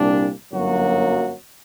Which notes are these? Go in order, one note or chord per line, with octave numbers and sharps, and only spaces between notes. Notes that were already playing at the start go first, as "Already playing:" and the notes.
Already playing: C2 A#2 G3 D4
G1 F#2 F#3 A#3 F#4